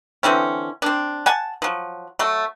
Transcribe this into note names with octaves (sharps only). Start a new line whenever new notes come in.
D3 E3 C4 C#4
C4 D4
F#5 G#5 A5
F3 F#3
F#3 A3